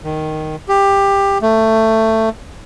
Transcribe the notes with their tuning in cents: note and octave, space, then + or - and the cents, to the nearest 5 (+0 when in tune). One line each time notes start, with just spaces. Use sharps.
D#3 -5
G4 +15
A3 +15